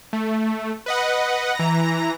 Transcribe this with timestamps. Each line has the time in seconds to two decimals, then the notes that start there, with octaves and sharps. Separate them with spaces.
0.13 A3
0.86 B4 D#5 F#5
1.55 E3 A#5 A#6